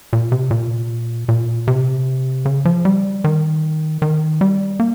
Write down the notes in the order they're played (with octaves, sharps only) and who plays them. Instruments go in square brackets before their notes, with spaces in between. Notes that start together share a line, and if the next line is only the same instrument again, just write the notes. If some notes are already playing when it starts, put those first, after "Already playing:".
[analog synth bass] A#2
C3
A#2
A#2
C3
C#3
F3
G3
D#3
D#3
G3
A#3